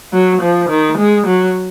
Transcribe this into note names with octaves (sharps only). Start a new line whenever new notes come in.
F#3
F3
D#3
G#3
F#3